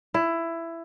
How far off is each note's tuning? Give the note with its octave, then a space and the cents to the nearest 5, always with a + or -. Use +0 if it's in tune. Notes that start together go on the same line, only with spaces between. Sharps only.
E4 +15